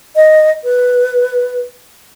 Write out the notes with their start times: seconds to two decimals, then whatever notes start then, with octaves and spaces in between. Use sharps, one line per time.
0.16 D#5
0.64 B4